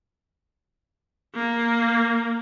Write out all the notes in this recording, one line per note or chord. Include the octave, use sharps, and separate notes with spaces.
A#3